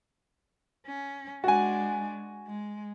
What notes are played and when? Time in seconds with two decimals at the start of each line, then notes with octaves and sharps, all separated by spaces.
0.86 C#4
1.44 G#3 D4 F#4 G#5
2.48 G#3